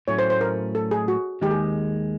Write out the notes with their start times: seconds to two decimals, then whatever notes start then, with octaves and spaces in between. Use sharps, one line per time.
0.08 A2 F#3 A3 C#4 C#5
0.19 C5
0.30 C5
0.41 A#4
0.75 A4
0.91 G#4
1.08 F#4
1.41 D#2 D#3 G#3 G4
1.51 G#4